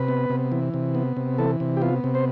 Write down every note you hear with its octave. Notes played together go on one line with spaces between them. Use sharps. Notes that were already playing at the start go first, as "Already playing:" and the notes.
Already playing: C3 B4
B3
C3
E3
C3
B3
C3
E3 A4
C3
G4
B3 F4
C3
C5